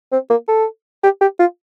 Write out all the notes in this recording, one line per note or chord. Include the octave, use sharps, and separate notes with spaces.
C4
A#3
A4
G4
G4
F4